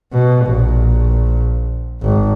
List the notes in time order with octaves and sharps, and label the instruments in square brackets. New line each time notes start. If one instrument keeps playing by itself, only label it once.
[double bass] B2
A#1
G#1